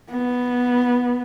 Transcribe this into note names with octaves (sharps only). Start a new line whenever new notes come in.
B3